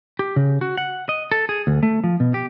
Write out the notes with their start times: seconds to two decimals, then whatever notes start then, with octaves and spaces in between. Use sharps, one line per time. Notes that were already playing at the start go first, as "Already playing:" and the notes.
0.19 G4
0.36 C#3
0.61 F#4
0.78 F#5
1.09 D#5
1.32 A4
1.49 G#4
1.67 D2
1.83 A3
2.04 F3
2.20 B2
2.34 G4